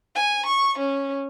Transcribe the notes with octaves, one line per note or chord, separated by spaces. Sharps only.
G#5
C#6
C#4